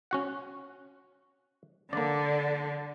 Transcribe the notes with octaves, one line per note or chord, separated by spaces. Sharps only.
C#4 F#4 F#5
D3 A#3 D5